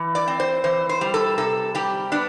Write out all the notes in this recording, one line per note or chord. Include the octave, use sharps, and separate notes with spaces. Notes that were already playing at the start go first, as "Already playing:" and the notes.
Already playing: E3
D5
C4
C5
E3 C5
C5
G3
A4
C3 A4
G3 G4
B3 D4